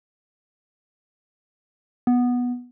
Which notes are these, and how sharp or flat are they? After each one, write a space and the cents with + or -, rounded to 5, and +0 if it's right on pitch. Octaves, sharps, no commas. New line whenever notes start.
B3 -10